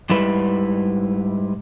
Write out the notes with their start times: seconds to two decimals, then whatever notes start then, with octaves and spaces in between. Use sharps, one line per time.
0.10 G#2 G3 E4 B4